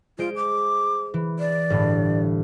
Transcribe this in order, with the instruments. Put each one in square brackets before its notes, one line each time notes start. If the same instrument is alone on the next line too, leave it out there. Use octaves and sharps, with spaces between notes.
[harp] G#3 C5 D7 [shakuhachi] F4
[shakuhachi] D6
[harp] E3
[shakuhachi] D5
[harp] G1 A2